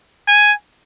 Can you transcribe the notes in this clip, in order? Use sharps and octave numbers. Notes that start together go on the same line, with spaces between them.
G#5